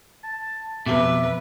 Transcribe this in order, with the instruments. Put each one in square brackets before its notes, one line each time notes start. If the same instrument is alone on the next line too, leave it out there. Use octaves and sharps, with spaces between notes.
[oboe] A5
[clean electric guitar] F2 B2 [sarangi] B4 [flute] E5 [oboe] D6